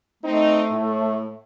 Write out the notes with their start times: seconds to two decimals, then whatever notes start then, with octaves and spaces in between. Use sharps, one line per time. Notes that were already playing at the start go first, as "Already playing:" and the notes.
0.23 A3 C4 D#4
0.70 A2